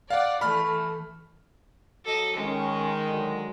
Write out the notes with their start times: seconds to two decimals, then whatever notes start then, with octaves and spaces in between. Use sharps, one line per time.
0.10 D5 F5 F#5
0.41 E3 A3 B5 F6
2.05 F#3 A4 D#5
2.36 D#3 G#3 C#4
3.10 D3 F#3